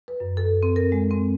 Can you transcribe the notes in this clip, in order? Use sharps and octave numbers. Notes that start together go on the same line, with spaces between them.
B4
F#2
A4
C4
A#4
G#3
C4